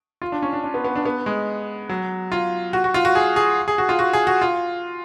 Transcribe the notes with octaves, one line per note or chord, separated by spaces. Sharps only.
F4
D4
C#4
D4
D4
B3
B3
D4
B3
G#3
F#3
F4
F#4
F#4
F4
F#4
G#4
G#4
G#4
F#4
F4
F#4
G#4
F#4
F4